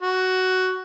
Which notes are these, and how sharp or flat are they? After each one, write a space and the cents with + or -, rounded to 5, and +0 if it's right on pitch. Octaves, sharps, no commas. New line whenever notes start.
F#4 +10